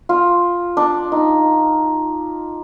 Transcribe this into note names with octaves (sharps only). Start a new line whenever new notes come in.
F4
D4
D#4